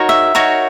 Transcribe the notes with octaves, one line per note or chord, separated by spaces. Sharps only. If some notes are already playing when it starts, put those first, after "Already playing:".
Already playing: D#4 F#4 A#4 C#5
E5
D#4 F#4 A#4 C#5